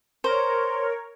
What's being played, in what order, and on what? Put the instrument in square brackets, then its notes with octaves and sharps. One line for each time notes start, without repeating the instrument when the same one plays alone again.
[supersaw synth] A#4 C#5 [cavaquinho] C5